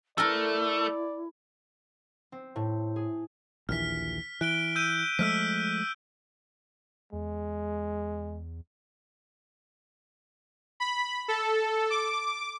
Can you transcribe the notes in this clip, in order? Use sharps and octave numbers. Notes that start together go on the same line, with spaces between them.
A3 E4 A4 A#4 D5
C4
A2
G#4
A#1 D#2 E3 F6 B6
E3 F#6 D7 G7
E6 G6 D#7
F3 G#3 A3 E6 F6 B6
E2 G#3
B5
A4
D6